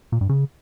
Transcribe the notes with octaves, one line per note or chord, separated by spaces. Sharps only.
A#2
G2
C#3